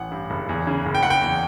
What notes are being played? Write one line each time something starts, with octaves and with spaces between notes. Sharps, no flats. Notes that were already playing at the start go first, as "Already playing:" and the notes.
Already playing: A1 F#5
G2
F#1
E2
C#3
F#1
G5
F#1 F#5
G5
E2